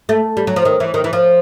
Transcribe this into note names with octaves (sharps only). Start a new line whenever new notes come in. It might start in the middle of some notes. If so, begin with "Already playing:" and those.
A3
G3
F#3
F3
D#3
E3
D#3
E3
F3